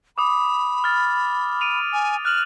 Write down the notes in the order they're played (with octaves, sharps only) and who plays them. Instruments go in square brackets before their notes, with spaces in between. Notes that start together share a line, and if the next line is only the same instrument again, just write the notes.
[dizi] B5 [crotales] D6 D#6
[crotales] F6 A6
D7 D#7 F7
[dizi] G#5
[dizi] F6 [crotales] F#6 E7 F#7